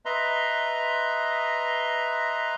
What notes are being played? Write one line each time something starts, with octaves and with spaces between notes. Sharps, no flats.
B4 D#5 E5 A#5 C6